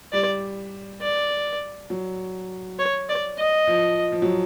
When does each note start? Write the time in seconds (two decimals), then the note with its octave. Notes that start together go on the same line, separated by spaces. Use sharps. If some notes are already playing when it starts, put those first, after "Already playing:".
0.12 G3 D5
1.01 D5
1.90 F#3
2.79 C#5
3.09 D5
3.39 D#5
3.67 F3
4.12 F3
4.22 F#3